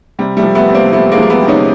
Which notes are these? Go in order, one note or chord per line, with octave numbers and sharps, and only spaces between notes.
C3 G3
G3 A3
F3
A3 B3
C3
A#3 C4
F3 A3 B3
G#3 A#3
F3
A#3
A3 B3
C3
C#4 D#4